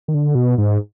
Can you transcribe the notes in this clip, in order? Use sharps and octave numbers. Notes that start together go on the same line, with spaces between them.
D#3
D3
B2
G#2